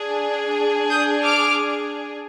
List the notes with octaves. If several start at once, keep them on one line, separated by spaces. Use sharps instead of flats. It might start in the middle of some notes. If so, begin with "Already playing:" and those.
Already playing: D4 G#4
D#6 G6
D6 F6